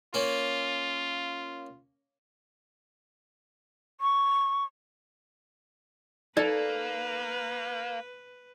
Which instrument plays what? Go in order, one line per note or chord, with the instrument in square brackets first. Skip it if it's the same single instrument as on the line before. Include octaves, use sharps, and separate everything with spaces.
[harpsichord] A#3 C#4 [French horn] F4
[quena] C#6
[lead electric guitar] A#3 [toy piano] D#4 D5 [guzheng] A4 [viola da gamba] B4